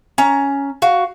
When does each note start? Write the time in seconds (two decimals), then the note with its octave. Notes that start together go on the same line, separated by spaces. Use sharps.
0.18 C#4 A#5
0.82 F#4 F5